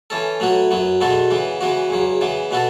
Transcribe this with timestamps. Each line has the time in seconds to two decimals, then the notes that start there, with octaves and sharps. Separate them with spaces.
0.10 E3 C#4 A4
0.40 A2 F#3 B3 F#4
0.71 F#2 F#3 B3
1.01 E2 B2 B3 F#4 A4
1.30 C#3 E3 B3
1.61 C#3 E3 B3 F#4
1.90 E2 C#3 F#3
2.21 C#3 E3 B3
2.51 B2 B3 F#4 A4